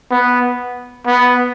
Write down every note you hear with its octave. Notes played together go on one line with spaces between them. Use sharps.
B3
B3